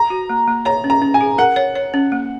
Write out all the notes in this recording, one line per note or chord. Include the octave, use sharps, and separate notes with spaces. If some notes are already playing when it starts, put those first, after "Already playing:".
Already playing: A#5
F#4
A#3
A#3
C#5 A#5
C#4
A#5
C#4
G#5
G#4
A#4 F#5
C#5
C#5
C#4
A#3